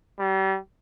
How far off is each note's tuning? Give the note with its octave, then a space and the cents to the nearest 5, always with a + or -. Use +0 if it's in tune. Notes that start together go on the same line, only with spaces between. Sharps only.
G3 -35